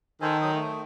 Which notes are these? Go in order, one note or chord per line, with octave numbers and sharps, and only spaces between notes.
D#3 A4 C5 G#5
F#3 D#6
A3